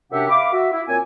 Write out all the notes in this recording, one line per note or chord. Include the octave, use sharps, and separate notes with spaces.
F#2 C3 D4 G4 E5 F#5
E5 F5 B5 D6
F#4 E5
E4
A#2 C4 C#5 G#5